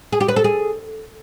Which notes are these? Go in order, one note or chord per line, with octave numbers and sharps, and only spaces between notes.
G#4
G4
B4
A4
G#4